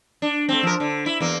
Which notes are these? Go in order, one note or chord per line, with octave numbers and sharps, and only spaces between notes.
D4
A3 C4
F3 A#4
D3
E4
E2 A#3